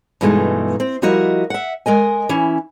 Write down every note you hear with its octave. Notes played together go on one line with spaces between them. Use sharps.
G2 B2 E3 G#3 A3 D#4
C4
F3 G3 E4 F#4 A#4 D#5
E5 F#5
G#3 A#4 D#5 G#5
E3 C#4 E4